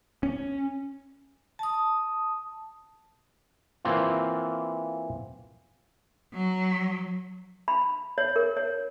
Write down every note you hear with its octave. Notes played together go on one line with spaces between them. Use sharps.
C#4
A5 D#6
E3 A#3 C4 F4
F#3
B5
C#5
A#4
C#5